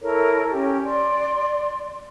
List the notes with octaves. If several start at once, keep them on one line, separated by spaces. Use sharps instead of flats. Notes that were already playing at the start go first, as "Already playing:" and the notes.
E4 A4 A#4 C#5
C#4 G4
D5 C6